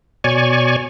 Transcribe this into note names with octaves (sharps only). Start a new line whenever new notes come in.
B2 C#5 D5 G#5 C#6